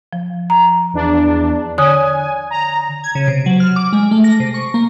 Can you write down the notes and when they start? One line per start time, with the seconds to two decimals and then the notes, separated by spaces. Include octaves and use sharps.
0.13 F3
0.50 A#5
0.94 E2 D4
1.78 D3 C#5 G#5 D#6
2.51 A#5
3.04 G#6
3.15 C#3
3.28 C3
3.46 F#3
3.60 F6
3.76 D6
3.93 G#3
4.11 A3
4.24 A#6
4.40 C3
4.54 C#6
4.74 A#3